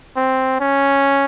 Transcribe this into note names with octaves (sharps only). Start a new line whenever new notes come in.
C4
C#4